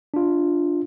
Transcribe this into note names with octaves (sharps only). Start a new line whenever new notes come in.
D4 F4